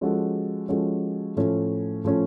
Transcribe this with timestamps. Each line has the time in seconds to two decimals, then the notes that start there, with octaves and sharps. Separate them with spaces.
0.01 F3 G#3 C#4 F#4 A4
0.69 F3 G#3 C#4 F#4 A4
1.37 A2 F3 A3 C#4
2.05 A2 F3 A3 C#4